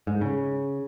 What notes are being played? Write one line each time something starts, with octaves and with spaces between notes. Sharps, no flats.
G#2
C#3